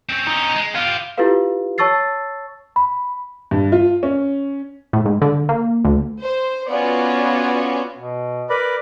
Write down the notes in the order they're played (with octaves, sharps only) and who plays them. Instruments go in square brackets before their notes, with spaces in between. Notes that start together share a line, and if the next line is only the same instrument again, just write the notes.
[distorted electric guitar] C4 C#4
[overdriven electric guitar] D#4
[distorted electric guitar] G#3
[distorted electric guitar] B3 G4 [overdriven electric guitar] F4
[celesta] E4 F4 G4 A4 B4 F5
C#5 A5 C#6 E6 A6 C7
B5
[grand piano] G2
F4
C#4
[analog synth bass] A2
G#2
D3
A#3
D2
[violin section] C5
B3 C#4 F4 F#4 D5 G#5
[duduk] B2
[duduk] A#4 [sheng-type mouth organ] B4 D5 B5